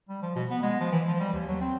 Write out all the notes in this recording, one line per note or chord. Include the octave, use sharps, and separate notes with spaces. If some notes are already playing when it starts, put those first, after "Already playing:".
G3
F3
B2
B3
G#3
F3
E3
F3
G3
D#2
F#3
C4